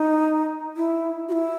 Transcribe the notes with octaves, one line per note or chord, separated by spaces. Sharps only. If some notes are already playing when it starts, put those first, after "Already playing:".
Already playing: D#4
E4
F#4
E4